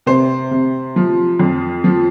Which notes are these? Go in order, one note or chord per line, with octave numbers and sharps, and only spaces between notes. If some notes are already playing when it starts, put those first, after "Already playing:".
C3 C5
C3
F3
F2
F3